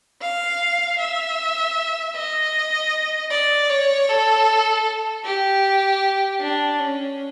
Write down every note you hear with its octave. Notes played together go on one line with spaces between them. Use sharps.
F5
E5
D#5
D5
C#5
A4
G4
D4
C#4